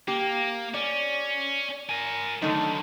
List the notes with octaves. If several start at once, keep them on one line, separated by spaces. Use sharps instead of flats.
A#3 G4
C#4 D5
A#4 G#5
F#2 D3 D#3 A3 D#4